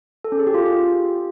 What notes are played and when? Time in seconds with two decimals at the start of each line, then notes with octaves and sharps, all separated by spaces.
0.24 A4
0.32 C#4
0.39 G#4
0.47 G4
0.54 F4